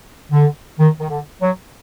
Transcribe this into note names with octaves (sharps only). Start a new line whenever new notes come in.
D3
D#3
D#3
D3
F#3